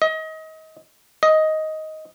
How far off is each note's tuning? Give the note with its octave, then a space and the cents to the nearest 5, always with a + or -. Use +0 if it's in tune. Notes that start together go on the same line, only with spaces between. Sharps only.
D#5 +30
D#5 +10